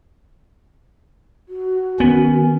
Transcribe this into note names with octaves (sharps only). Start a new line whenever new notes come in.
F#4
D#3 B3 C#4